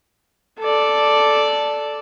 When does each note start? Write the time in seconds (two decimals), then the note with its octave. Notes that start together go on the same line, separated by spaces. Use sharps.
0.60 A4 D5